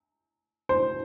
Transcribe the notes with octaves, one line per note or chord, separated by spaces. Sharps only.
C5